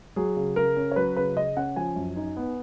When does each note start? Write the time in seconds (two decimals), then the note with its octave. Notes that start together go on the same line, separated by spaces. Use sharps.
0.16 F#3 G#4
0.37 C#3
0.56 C#3 A#4
0.76 C#4
0.91 C#5
0.96 F#3 B4
1.16 C#3 B4
1.36 C#3 D#5
1.56 C#4 F#5
1.76 F3 G#5
1.96 F#2
2.16 D#4
2.37 B3